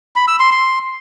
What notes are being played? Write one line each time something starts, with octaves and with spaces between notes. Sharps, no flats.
B5
E6
C6
C6